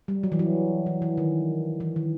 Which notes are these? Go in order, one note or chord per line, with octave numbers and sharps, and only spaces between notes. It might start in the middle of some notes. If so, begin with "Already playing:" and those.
G3
F#3
E3
F#3
E3
E3
D#3
E3
D#3